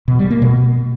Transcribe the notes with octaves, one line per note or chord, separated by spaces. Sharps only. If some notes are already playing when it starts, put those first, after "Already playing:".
B2
G3
A#3
B2